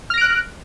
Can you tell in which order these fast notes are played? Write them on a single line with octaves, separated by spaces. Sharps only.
F6 A#6 D7 F#6